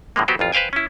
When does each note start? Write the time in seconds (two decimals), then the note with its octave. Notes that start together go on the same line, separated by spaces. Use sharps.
0.16 A2 D3 F3 G#3 A#3
0.28 F#3 B3 F#4 G4 B4 C5
0.39 A1 F2 F4
0.52 B4 C5 F5 G5 G#5
0.73 C#4 E4